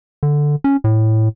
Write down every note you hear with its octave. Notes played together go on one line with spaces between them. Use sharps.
D3
C#4
A2